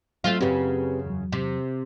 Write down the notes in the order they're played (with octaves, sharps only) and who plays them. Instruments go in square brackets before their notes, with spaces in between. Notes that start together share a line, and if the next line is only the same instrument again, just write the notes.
[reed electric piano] F#3 [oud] A3 C4 F4
[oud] F#2 C#3 [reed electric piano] C4 G4 B4
[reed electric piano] E2 F#3
[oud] C3